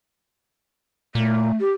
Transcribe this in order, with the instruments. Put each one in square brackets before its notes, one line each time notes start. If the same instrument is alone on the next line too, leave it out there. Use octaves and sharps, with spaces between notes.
[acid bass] A#2 [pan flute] A3
[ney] G4